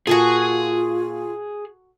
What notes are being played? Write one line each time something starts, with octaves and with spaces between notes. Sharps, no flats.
A#2 F4 F#4 G#4 A4 G#5 A5